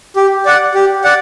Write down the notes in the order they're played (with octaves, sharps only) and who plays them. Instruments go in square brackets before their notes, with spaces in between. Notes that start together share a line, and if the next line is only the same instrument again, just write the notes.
[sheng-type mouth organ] G4
D5 F#5
G4
D5 F#5